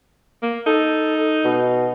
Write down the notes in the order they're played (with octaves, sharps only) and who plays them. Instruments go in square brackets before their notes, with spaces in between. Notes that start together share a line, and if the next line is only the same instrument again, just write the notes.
[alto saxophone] A#3
[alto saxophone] D#4 [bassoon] A4
[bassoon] B2